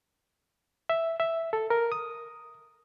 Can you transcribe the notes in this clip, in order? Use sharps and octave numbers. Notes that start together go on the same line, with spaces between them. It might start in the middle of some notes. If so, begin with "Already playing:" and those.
E5
E5
A4
A#4
D#6